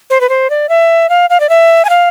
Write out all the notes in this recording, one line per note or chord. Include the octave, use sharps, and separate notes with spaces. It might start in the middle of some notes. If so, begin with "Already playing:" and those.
C5
B4
C5
D5
E5
F5
F5
D5
E5
G#5
F5